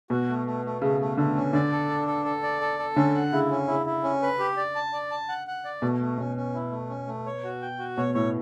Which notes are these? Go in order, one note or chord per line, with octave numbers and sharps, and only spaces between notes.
B2 F#4
A3
A3
A3
C#3 A3
A3
D3 A3
C#4
D3 D5
A4
D4
A4
A4
D5
A4
A4
D3 C#4
F#5
C#3 E4
C#4
C#3 E4
E4
C#4
B4
G4
D5
A5
D5
A5
F#5
F#5
D5
B2 A3
A3
B2 C#4
C#4
E4
A3
C#4
A3
C#5
F#4
G5
F#4
B2 C#5
A2 C#5